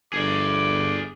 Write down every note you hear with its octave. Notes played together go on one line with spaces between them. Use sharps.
G1 G#4 D5 D6